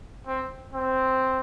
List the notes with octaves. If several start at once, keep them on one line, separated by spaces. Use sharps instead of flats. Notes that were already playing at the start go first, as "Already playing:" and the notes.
C4
C4